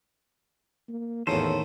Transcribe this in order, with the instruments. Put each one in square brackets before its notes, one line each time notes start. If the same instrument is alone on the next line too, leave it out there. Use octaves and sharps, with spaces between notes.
[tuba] A#3
[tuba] E2 [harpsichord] A2 A#3 C#4 [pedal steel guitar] D#3 A4 C5